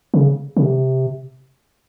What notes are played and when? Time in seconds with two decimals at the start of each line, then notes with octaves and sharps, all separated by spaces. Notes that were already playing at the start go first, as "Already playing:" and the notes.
0.14 C#3
0.57 C#3
0.63 C3